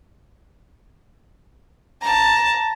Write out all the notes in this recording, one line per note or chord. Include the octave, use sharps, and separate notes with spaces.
A5 A#5